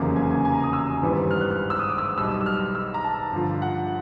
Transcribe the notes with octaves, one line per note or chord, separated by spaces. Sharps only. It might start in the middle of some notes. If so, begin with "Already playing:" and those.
Already playing: F1 E2 C#3 F#3 A#3
G#5
G#5
G#5
A#5
D#6
E6
G#1 G2 E3 G3 B3
F6
F#6
F6
E6
D#6
D6
E6
D#6
B1 B2 G3 E6
E6
F6
E6
A#5
A5
G2 D3 F3
F#5